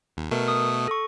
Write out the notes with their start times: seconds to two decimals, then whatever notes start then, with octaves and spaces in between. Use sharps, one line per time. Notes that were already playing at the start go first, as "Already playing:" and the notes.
0.17 D#2
0.31 B2 A3 A#4
0.48 D#6
0.88 A4 C#6